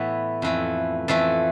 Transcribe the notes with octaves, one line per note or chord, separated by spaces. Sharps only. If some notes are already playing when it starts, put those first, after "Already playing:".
Already playing: A2 E3 B3
F2 E3 A3
F2 E3 A3 A5